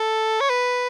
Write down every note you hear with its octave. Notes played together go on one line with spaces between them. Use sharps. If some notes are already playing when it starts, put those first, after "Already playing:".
Already playing: A4
C#5
B4